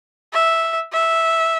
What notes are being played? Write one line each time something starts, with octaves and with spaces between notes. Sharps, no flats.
E5
E5